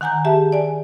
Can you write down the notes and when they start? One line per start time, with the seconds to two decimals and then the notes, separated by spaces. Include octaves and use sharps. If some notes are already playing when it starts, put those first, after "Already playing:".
0.01 D#3 F#5 G#5 A#5 G6
0.25 G4 G#4 E5 A5
0.52 D5 G#5